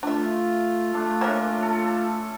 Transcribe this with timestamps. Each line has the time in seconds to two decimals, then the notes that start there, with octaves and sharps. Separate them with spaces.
0.03 A3 D4 F4 E5
0.94 A3 D4
1.21 A#3 C#4 D4 A#4 C#5 E5
1.63 A4